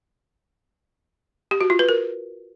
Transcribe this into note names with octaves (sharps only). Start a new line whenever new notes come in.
G4
F#4
F4
B4
A#4